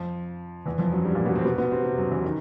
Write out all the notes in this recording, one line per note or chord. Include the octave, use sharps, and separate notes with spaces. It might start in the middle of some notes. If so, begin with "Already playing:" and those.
Already playing: F2 F3
E2 E3
F2 F3
F#2 F#3
G2 G3
A#2 A#3
B2 B3
C3 C4
B2 B3
B2 B3
C3 C4
C3 C4
F#2 F#3
E2 E3
D#3